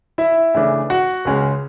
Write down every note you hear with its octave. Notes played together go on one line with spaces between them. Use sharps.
E4 E5
C#3 E3 A3 D4
F#4 F#5
C#2 C#3 G#3 C#4